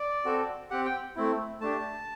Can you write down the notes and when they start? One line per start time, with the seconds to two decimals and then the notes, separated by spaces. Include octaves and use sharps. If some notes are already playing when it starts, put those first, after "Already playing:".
Already playing: D5
0.25 C4 F#4 A4
0.70 C4 G4 F#5
0.85 G5
1.16 A3 C4 E4
1.61 A3 D4 G4 A5